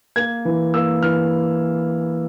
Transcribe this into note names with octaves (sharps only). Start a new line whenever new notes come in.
A#3 G#6
E3
A#3 E6
E3 F6